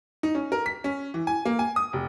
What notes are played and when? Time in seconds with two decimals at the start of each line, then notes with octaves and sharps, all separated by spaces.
0.23 D#4
0.35 C#4
0.52 A#4
0.66 B6
0.84 C#4
1.14 E3
1.27 G#5
1.45 A#3
1.59 G#5
1.76 D#6
1.93 F1